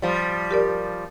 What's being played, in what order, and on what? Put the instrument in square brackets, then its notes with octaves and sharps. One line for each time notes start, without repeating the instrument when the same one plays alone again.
[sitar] F3 G3
[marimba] G4 A#4 D5